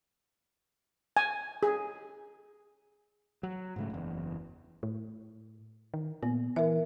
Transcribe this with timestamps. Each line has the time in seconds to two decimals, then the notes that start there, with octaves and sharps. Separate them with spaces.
1.17 G#5
1.63 G#4
3.43 F#3
3.76 G#2 C#3 A3
3.90 F#1 E2
4.83 A2
5.94 D#3
6.23 A#2 B3
6.56 E3 A#4 E5